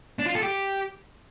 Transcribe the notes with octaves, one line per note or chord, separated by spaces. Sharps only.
D4
F4
A4
G4